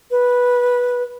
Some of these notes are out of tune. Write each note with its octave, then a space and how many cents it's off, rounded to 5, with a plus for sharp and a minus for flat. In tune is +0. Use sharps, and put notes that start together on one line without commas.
B4 -10